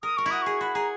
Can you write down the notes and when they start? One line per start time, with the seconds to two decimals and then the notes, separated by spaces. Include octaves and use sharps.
0.03 A#4 D#6
0.17 A#4 C#6
0.26 E4
0.31 F#4 D#6
0.42 G#4 C#6
0.61 F#4 B5
0.75 G#4 A#5